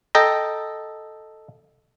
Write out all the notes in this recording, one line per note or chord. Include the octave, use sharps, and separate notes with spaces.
A4 D#5 G5 A#5